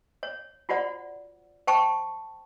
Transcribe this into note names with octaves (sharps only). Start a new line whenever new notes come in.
C#5
F4 F#4 C5 D5 F#5
C5 G5 A5 C#6